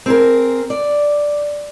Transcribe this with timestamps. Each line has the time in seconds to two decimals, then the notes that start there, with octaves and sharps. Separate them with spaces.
0.06 C4 G#4 A#4
0.70 D5